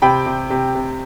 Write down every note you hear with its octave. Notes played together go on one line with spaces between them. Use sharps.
C3 G5 B5
C3
C3
C3